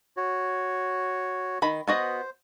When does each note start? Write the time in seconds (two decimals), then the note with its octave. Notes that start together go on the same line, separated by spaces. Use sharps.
0.17 F#4 C#5
1.62 D#3 B5
1.88 B3 F#4 C5 D#5